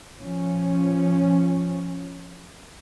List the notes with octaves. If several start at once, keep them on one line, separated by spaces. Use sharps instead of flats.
F3 C#4